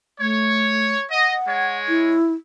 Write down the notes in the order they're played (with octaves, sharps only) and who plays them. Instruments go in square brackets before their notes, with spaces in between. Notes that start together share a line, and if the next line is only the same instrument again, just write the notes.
[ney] A3 [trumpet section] C#5
[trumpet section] D#5 [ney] F#5
[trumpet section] G#3 C#5
[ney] E4